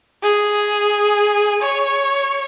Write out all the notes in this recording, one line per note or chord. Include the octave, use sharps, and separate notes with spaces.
G#4
C#5